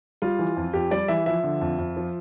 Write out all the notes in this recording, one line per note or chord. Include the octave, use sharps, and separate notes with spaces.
G3 F4
E3
F2
F2 G4
G3 D5
E3 E5
F3 E5
D3
F2
F2
F3